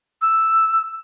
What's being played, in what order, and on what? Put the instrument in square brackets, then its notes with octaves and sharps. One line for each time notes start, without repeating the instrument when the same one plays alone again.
[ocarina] E6